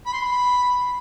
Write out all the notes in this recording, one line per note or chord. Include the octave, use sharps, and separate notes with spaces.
B5
C6
B5